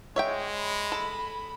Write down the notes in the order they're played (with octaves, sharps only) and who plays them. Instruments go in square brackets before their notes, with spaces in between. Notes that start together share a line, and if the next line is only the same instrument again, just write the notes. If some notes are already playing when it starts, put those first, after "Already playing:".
[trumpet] G#3 [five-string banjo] C#5 E5 G5
[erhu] B5
[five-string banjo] A4